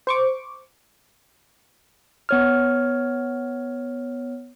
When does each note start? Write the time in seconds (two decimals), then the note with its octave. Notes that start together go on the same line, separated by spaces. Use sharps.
0.07 C5 C#6 D6
2.29 B3 C#5 F6